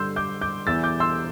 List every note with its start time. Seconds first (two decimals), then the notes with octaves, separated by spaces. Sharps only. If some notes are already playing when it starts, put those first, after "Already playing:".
Already playing: G2 D3 C6 E6 G6
0.16 D6 G6
0.41 D6 G6
0.67 E2 E3 E6 A6
0.83 D6 G6
1.00 C6 E6